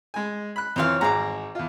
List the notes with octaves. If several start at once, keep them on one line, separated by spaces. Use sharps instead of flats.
G#3 G#5
B5 F#6
F2 E3 C5 C#5 F5
G#1 G#4 F#5 A#5 D6
E2 F4